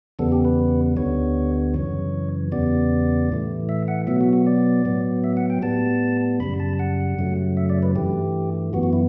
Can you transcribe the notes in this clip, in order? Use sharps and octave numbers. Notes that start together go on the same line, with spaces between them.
E2 C#3 G3 B3 A4
G4
B4
D2 D3 G3 B3 C#5
F#2 C#3 E3 C#5
E2 C#3 G3 B3 D5
A2 E3 A3
E5
F#5
B2 F#3 B3 E5
F#4
F#4
D5
A2 F#3 B3
E5
F#5
G5
A2 G3 B3 A5
F#2 C#3 G3 B5
A5
F#5
F#2 C#3 F#3 A3
E5
D5
B4
G2 E3 A3 G4
F#2 E3 B3 F#4
F#4
E4